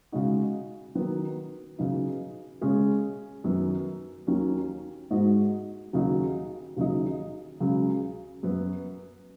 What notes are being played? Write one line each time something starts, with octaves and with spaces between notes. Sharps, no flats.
C#3 G#3 D#4 F#4
D#3 F#3 B3
C#3 F#3 B3 D#4
C#3 G#3 C#4 G#4
F#2 D#3 F#3 B3
D#2 D#3 F#3 C#4
G#2 G#3 D#4 F#4
D#2 C#3 F#3 D#4 F#4
D#2 C#3 F#3 D#4
C#2 C#3 F#3
F#2 F#3 B3